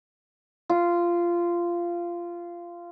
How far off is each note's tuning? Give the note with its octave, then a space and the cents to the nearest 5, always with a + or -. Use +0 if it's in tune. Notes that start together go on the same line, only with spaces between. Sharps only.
F4 -15